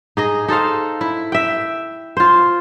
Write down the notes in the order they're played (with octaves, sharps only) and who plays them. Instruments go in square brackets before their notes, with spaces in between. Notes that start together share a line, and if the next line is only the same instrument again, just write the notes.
[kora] D#4 G#4 D#5
D#4 A4 C5 F5
E4
E5 G5
F4 C5